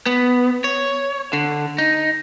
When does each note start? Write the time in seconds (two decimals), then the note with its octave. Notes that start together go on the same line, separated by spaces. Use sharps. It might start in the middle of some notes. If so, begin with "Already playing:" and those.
0.06 B3
0.64 C#5
1.33 D3
1.78 D#4